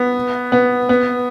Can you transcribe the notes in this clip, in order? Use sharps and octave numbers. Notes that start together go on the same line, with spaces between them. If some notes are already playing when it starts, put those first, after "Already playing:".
Already playing: B3
B3
B3